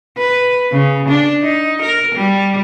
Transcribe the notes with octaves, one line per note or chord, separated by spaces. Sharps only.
B4
C#3
D4
D#4
A#4
G3